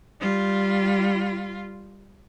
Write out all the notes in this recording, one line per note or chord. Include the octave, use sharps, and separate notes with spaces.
G3 F4